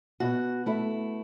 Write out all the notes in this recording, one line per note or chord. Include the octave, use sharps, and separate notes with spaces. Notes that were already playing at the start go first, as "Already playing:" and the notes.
B2 F#4
A3 E4